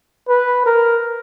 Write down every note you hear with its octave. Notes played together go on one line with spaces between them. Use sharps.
B4
A#4